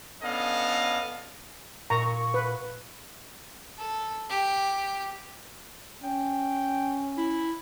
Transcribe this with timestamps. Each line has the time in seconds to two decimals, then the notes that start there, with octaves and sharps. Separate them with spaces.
0.23 B3 C#4 D4 A4 D#5 F5
1.90 A#2 A#5 C#6
2.34 B4
3.78 A4
4.29 G4
6.03 C#4 G5
7.17 E4